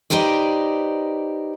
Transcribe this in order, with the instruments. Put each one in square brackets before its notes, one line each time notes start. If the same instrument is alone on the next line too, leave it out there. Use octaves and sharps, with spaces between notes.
[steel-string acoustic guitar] D#4 G4 B4 C5 D5